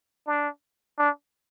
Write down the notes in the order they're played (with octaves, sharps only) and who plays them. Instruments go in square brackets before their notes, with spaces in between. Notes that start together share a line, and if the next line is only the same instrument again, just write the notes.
[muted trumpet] D4
D4